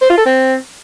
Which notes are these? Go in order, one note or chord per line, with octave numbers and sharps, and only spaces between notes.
C5
F4
A4
C4